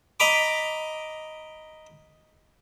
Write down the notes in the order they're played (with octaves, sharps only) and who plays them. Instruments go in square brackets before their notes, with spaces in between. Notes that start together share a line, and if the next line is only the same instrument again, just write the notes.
[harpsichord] D#5 A#5 B5 D6